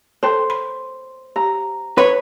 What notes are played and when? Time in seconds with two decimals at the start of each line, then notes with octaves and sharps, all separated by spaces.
0.23 A4 C5 G5 A5
0.50 B5
1.36 G4 A#5
1.98 B4 C#5